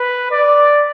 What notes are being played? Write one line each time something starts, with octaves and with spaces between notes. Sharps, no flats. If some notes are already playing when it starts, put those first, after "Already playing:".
Already playing: B4
D5